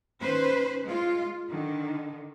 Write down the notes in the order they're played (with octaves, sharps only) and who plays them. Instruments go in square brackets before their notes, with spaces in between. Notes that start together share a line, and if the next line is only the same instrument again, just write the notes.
[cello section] D#3 C#4 B4 C5
G#3 F4
D3 D#3